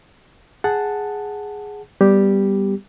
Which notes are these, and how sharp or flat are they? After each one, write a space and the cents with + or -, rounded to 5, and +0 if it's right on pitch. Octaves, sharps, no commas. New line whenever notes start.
G#4 +0 F#5 +0 A5 +0
G3 +0 B3 +0 G4 +0